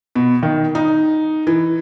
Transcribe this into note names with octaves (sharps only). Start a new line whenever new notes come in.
B2
D#3
D#4
E3